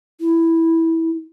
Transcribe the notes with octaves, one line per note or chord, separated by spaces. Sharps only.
E4